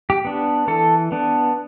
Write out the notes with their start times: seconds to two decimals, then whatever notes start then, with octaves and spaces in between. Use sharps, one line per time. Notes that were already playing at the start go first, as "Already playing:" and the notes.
0.10 G4
0.25 B3 D4
0.68 E3 A4
1.12 B3 D4